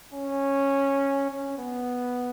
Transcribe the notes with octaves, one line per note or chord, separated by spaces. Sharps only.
C#4
C#4
B3